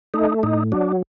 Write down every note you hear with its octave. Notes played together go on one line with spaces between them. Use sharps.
A3 D#4
A2 D#4
F#3 D4